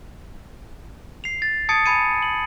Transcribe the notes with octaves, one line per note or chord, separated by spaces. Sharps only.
C7 F7
A6
A5 D#6 G#6 A6 C#7 D7
G#5 B5 G#6 C#7 D#7
F#7